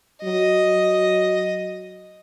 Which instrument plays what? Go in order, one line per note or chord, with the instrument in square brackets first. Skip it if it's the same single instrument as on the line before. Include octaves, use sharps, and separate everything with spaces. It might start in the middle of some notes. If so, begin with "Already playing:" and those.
[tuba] F#3 [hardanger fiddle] D#5